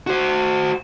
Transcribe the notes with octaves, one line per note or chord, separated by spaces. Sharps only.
F#4 C5